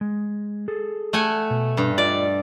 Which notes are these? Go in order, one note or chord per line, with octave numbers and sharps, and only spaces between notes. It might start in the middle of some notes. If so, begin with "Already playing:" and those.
G#3
G#4 A4
A3 F#5 G#5
B2
G2
F4 D5 D#5